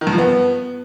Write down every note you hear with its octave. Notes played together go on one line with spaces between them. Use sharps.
D#3
G2
F3
B3